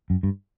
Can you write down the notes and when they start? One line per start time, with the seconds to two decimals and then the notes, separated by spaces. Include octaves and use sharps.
0.10 F#2
0.23 G2